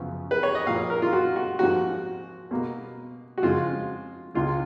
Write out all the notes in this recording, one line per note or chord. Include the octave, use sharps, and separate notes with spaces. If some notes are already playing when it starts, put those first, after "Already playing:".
Already playing: F#2 C#3 F3 B3
B4
C#5
D#5
A#2 F3 A#3 F5
A#4
F4
F#4
F#4
G#2 F3 A#3 F#4
B2 A#3
F#4
F2 C#3 G#3 F4
C#2 C#3 G#3 F4